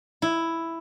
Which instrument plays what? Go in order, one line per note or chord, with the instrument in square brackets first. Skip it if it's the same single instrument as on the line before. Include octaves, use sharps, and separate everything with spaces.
[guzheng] E4